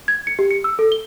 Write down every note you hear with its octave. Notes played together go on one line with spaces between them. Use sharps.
G#6
C#7
G4
C#7
E6
A4
G7